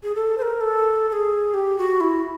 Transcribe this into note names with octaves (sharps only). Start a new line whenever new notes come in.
G#4
A4
C5
A#4
A4
A4
G#4
G4
F#4
E4